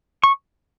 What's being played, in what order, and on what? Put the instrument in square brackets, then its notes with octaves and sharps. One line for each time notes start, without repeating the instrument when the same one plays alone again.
[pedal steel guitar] C#6